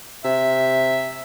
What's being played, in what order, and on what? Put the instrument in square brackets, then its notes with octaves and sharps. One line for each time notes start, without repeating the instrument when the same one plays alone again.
[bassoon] C3 [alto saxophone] E5